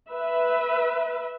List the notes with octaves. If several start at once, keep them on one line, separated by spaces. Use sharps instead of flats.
B4 E5